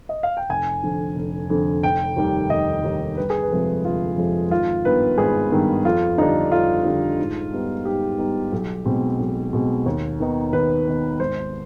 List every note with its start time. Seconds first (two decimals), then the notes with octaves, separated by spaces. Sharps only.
0.09 D#5
0.23 F5
0.37 G5
0.49 F1 G#5
0.83 F2 D3
1.16 F1
1.50 F2 D3
1.83 F1 G5
2.17 D#2 D#3 G3
2.50 F1 D#5
2.83 D#2 D#3 G3
3.17 G1 B4
3.30 G#4
3.43 B4
3.51 F2 C3 F3 G#3
3.85 G1 F4
4.17 F2 C3 F3 G#3
4.51 G#1 F4
4.84 G2 D#3 B3 B4
5.18 G#1 G#4
5.51 G2 D#3 B3
5.85 F2 F4
6.18 D3 G3 D4 D#4
6.51 F2 F4
6.85 D3 G3 D4
7.19 G#2
7.52 G3 B3 D#4
7.85 G#2 G4
8.18 G3 B3 D#4
8.52 B1
8.85 B2 G#3 C4
9.19 B1
9.53 B2 G#3 C4
9.86 D#2
10.20 D#3 B3 D#4
10.53 D#2 B4
10.87 D#3 B3 D#4
11.20 G#1 C5